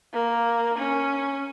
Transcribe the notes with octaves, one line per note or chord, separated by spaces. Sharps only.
A#3
C#4